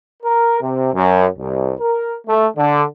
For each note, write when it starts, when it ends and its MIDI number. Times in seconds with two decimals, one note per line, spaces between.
0.22 0.57 70
0.60 0.89 48
0.93 1.26 42
1.36 1.71 36
1.80 2.15 70
2.27 2.46 57
2.56 2.83 50